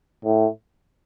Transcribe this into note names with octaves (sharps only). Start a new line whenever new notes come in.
A2